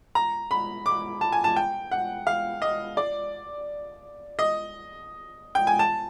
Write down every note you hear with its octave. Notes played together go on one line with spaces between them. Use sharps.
A#5
B5
D6
A5
G#5
A5
G5
F#5
F5
D#5
D5
D#5
G5
G#5
A5